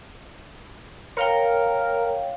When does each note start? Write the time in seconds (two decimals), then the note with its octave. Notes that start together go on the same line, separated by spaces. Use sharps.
1.17 A#4 C#5 F5 G5